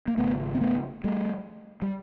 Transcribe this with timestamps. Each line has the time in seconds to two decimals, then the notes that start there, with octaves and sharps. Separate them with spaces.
0.08 A#3
0.17 G#1 F#2 C#3 A3 B3
0.55 C4
0.61 A3 B3
1.04 G3 A3
1.82 G3